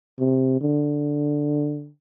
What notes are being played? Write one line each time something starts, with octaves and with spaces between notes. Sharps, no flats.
C3
D3